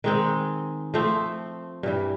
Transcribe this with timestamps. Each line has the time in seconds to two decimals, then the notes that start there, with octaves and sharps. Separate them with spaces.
0.04 D#3 G#3 C4
0.94 F3 A3 C4
1.83 G2 E3 G3